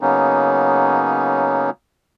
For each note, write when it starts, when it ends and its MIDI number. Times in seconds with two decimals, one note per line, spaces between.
0.01 1.70 49
0.01 1.70 54
0.01 1.70 58
0.01 1.70 59
0.01 1.70 61
0.01 1.70 63